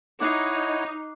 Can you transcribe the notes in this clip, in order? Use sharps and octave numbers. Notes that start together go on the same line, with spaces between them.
D#4 E4 C#5 F#5 D6 F#6 C7